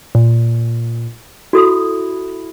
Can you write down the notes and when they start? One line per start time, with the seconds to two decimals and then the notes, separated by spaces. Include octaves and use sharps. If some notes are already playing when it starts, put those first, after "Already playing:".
0.15 A#2
1.53 E4 F#4 A4 D#6